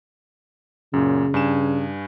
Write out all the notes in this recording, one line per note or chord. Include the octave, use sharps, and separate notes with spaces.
F#2 A#2 C#3
G2 G#5 E7